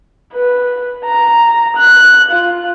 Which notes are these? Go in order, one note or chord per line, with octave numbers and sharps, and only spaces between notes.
B4
A#5
F#6
F4